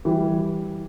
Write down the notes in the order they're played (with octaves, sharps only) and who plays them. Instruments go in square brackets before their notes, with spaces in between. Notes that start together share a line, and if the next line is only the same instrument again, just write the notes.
[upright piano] E3 G3